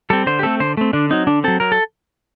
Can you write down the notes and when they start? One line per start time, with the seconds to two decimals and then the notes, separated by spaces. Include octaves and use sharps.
0.10 G3 C4 A4
0.27 D3 C5
0.39 G4
0.43 A3 C4 A4
0.60 D3 C5
0.77 A3 C4
0.93 D3 D4
1.10 F#3 C4 D#4
1.27 D3 D4
1.44 F#3 C4 A4
1.60 F#3 A#4
1.72 A4